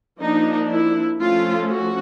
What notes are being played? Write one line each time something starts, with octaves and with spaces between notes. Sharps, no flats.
F3 A#3 D4 D#4
E4
F3 A3 C#4 F4
F#4